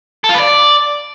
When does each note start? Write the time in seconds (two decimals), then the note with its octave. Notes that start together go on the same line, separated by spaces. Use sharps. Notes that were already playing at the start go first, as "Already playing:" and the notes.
0.24 A4
0.29 F4
0.34 B4
0.39 D5